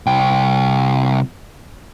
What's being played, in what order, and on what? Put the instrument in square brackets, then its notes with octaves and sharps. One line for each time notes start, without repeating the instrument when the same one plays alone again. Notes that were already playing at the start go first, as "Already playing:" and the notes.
[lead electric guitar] C2 G5